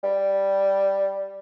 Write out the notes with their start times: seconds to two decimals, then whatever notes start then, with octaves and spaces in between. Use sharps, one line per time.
0.03 G3